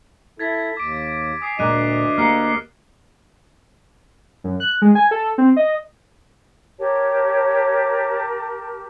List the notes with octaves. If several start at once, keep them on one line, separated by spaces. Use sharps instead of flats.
E4 A4 G#6 A6 B6
D#2 D6 D7
G#5 D#6 C7
D2 A#2 G#3 D4 D#5 D6 F#6 D#7
A#3 G4 F5 F6 C7 C#7
F#2
F#6
G#3
G#5
A4
C4
D#5
G4 A#4 C#5 A5